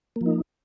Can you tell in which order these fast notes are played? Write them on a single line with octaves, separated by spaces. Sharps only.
A#3 F3 D#4